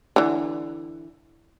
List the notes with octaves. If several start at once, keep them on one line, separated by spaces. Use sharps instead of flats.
D3 E3